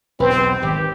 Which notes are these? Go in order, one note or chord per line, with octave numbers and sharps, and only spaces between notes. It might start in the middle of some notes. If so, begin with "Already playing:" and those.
B1 E2 C4 B4
G#1 G4